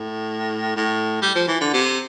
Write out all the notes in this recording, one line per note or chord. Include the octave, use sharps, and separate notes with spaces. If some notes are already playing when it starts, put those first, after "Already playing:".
Already playing: A2
A2
G3
F3
E3
D3
C3